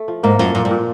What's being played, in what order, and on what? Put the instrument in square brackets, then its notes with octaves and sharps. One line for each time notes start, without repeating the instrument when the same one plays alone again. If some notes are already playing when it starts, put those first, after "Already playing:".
Already playing: [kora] A3
F3
[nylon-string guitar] G#2 [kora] A#3
[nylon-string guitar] F#2 [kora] F3
[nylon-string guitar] F#2 [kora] A#2
[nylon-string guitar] G2
[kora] A#2